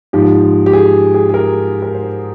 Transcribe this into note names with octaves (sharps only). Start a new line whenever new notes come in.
G#2 F3 G4
G4
G#4
G#4
G#4
A#4
A#4
C5